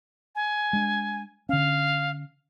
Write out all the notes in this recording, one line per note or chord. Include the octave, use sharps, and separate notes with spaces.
G#5
G#3 D4
D3 C#4 F5